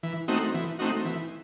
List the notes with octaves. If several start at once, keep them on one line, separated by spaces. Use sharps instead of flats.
E3
A3 C4 D#4 F#4
E3
A3 C4 D#4 F#4
E3